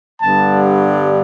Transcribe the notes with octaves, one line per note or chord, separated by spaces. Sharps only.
G2 D3 G3 B3 A5